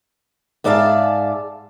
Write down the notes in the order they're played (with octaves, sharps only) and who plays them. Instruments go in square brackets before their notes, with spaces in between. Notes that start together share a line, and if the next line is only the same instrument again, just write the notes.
[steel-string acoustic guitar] G#2 G#3 D5 E5 F5 A5